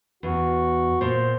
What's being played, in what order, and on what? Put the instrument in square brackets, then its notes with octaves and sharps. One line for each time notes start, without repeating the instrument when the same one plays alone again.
[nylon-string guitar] E2 [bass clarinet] F#4
[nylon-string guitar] A#2 [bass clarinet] C5